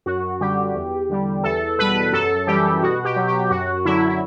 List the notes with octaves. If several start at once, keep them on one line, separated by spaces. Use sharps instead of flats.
F#2 F#4
D3 G3 G4
E2
D3 G3
E2 A4
B2 G3 B4
F#2 A4
E3 G3 G4
B2 F#4
G4
F#3
G4
F#2 F#4
D3 F#3 E4
E4